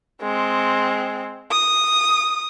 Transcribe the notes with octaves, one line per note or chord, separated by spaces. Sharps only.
G#3 C4
D#6